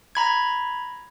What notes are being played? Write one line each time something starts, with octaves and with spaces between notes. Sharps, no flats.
A#5 B5 G#6